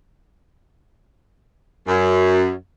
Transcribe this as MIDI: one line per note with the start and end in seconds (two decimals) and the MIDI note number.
1.87 2.52 42